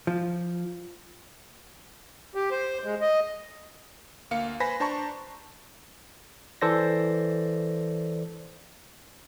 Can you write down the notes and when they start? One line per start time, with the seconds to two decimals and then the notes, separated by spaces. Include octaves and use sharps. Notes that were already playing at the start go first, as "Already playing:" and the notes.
0.07 F3
2.35 G4
2.51 C5
2.84 G#3
3.01 D#5
4.31 D2 A#3 F5 C#7
4.60 B4 C5 G#5 B5 A#6 B6
4.80 D4 C5 A5 A#5 C#6
6.61 E3 A4 C5 D5 A#6